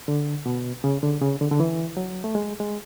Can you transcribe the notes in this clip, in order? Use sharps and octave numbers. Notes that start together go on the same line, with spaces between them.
D3
B2
C#3
D3
C#3
D3
D3
E3
F#3
A3
G#3
G#3